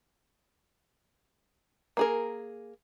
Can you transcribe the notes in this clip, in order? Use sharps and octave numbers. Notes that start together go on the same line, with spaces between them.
A#3 G#4 A#4